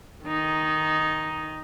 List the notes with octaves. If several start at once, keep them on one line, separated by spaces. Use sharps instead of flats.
D#3 D#4